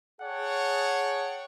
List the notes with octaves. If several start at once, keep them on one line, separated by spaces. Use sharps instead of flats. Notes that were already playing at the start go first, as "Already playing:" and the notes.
G#4 C#5 F#5 G5 A5